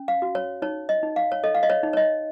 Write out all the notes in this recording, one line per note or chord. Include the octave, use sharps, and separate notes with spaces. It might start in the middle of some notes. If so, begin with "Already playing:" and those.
Already playing: C#4
F5
F#4
C#5
D#4 C#5
D#5
D#4
F5
C#5
A4 D#5
F5
D#5
C#5
D#4
C#5
D#5